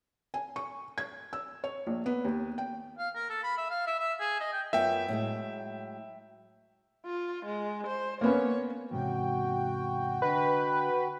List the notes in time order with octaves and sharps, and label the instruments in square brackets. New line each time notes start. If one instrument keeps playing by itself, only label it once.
[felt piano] G#5
C#6
G#6
E6
C#5
A#1
B3
D#2
G5
[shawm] F5
A#4
A4
B5
E5
F5
E5
E5
G#4
D#5
G5
[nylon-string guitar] F#2 B3 F4 [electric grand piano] E5 G5
[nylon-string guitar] A2 F#3 G#3
[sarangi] F4
G#3
C5
[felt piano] A#3 B3 C#4 [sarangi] C#5
[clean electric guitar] E2 G#2 C3 [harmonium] F#4 G5
[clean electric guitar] D3 D#5 [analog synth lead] B4